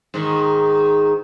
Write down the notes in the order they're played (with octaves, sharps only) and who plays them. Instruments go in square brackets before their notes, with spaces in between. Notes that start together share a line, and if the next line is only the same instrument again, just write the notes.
[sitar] G#2 D#3